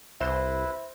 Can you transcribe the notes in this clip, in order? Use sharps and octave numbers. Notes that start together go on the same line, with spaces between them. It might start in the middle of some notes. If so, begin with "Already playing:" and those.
C2 E4 B4 C5 E5